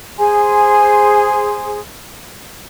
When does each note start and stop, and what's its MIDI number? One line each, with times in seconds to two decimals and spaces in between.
0.18 1.79 68
0.18 1.79 72
0.18 1.79 80
0.18 1.79 84